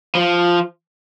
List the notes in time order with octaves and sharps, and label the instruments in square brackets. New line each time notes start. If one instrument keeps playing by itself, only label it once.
[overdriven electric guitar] F3